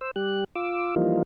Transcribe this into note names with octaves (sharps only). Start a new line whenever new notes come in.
C5 E6
G3 G4 F#6
F4 D6 E6
E3 F3 G3 A#3 D#4 F4